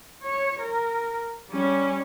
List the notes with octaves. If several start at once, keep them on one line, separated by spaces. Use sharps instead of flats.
C#5
A#4
G3 C#4